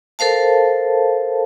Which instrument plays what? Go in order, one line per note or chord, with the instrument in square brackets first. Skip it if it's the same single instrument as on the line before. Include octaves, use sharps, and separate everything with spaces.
[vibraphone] A4 A#4 C5 F5 A5